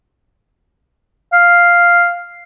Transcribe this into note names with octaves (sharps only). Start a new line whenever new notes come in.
F5